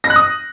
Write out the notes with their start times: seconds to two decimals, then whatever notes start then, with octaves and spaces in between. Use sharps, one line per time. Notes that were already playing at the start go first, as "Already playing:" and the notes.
0.04 A#6
0.10 F#6
0.16 D#6